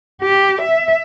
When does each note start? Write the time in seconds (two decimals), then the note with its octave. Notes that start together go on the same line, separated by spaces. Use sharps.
0.22 G4
0.62 E5